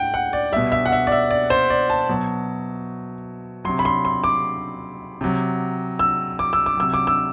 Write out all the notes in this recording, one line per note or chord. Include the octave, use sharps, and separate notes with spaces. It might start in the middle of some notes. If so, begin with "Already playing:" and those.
Already playing: A2 F#5 G5
F#5
D5
B2 G3 E5
E5
F#5
E5
D5
E5
D5
C5
D5
A5
B2 F#3
C3 F#3 C6
B5
C6
C6
D6
C3 F#3
E6
D6
E6
D6
C3 F#3 E6
D6
E6